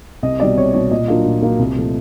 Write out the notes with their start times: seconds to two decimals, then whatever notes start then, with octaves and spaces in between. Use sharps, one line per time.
0.23 C2 D#5
0.40 B2 G3 D5
0.57 C2 C#5
0.74 B2 G3 C#5
0.90 A#2 D#5
1.08 F#3 A#3 D4 F4
1.26 A#2
1.42 F#3 A#3 D4 F4
1.59 C2
1.76 A#2 F3 A3